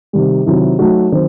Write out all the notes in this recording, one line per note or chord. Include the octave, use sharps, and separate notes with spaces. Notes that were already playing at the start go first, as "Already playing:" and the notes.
C3 D#3 G3
C3 D#3 F#3 C4 E4
F#3 A3 D#4 F#4
D#3 F#3 C4